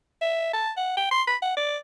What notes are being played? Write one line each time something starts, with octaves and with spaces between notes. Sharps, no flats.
E5
A5
F#5
G5
C6
B5
F#5
D5